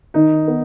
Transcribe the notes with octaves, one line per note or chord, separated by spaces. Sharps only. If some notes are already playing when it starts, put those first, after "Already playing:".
D#3 D#4
B3